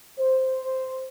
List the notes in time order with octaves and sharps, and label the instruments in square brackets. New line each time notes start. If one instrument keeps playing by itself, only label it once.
[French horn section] C5